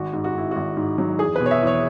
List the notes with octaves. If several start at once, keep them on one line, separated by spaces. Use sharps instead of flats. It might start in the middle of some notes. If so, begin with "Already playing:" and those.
Already playing: G#1 F#4
G#2
F#4
G#2 E4
G#1 F#4
G#2
F#3
E2 G#4
B2 B4
C#5
E5
E2
C#5